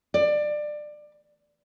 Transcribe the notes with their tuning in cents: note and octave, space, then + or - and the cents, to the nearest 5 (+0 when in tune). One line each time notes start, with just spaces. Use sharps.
D5 +20